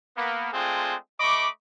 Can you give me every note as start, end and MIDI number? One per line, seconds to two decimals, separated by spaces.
0.17 0.49 58
0.17 0.49 59
0.53 0.95 56
0.53 0.95 57
0.53 0.95 60
0.53 0.95 62
0.53 0.95 65
0.53 0.95 68
1.20 1.48 57
1.20 1.48 75
1.20 1.48 83
1.20 1.48 85
1.20 1.48 86